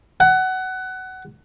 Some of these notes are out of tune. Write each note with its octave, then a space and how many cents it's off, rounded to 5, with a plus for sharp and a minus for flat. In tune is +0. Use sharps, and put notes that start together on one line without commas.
F#5 +20